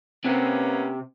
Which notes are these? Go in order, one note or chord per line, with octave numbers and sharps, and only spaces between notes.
C3 A#3 B3 C#4